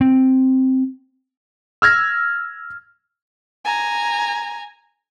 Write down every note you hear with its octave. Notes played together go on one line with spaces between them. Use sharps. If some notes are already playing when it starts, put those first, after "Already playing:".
C4
E6 F6 G#6 A#6
G#5 A#5